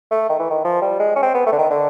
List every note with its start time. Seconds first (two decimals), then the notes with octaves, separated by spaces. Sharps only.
0.11 A3
0.29 D#3
0.39 E3
0.50 D#3
0.64 F3
0.82 G3
0.99 G#3
1.16 C#4
1.23 C4
1.34 B3
1.46 A3
1.52 D3
1.58 D#3
1.70 D3